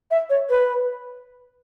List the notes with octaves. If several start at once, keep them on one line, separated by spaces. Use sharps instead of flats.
E5
C#5
B4